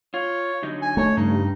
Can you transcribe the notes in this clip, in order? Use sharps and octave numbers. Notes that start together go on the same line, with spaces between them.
F4 C#5
D3 F#3 D#4
G#5
A3 C#5
G2 C#3 D#4